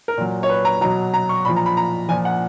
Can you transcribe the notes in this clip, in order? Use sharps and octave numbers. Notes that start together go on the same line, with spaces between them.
A#4
A#2 F#3
C#5
B4
A#5
B2 F#3 A#5
A#5
C#6
A#2 F3 B5
A#5
B5
A#5
A#2 F3 G#5
F#5